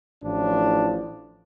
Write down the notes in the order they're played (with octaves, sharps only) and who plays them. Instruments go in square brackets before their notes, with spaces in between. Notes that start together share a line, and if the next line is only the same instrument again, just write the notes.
[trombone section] A1 A2 F3 D4